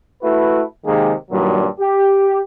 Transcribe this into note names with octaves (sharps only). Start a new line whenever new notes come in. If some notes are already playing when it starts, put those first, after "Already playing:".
A3 E4 F#4 B4
C3 D#3 G#3 A#3 G#4
G2 A#2 D#3 F#3
G4